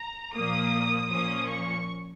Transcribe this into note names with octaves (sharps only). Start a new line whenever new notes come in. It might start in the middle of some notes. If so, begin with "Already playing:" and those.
Already playing: A#5
A#2 F3 A#3 D#6
A#2 F3 A#3 C#4 D#6
C#6